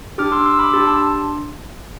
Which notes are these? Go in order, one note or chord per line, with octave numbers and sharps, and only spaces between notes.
D4 G4 D6 F6
C6 E6
C6 E6
B5 D6
D4 G4 C6 E6
A5 C6